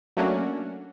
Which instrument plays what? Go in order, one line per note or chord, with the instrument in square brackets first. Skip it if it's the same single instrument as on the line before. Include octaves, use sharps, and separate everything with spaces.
[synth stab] F#3 A3 A#3 C#4 D4 F#4